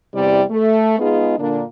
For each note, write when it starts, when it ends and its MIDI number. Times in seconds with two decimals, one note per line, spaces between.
0.14 0.42 40
0.14 0.42 48
0.14 0.42 55
0.14 0.42 64
0.14 0.42 74
0.51 0.98 57
0.99 1.36 56
0.99 1.36 59
0.99 1.36 63
0.99 1.36 65
0.99 1.36 68
1.38 1.63 46
1.38 1.63 50
1.38 1.63 58
1.38 1.63 62